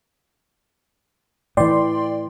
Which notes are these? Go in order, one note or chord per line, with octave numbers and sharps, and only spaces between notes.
A2 E3 D5 G5 C6